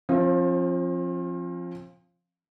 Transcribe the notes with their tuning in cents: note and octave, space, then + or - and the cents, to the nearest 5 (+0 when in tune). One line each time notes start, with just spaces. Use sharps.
F3 +0 C4 +40 F5 +0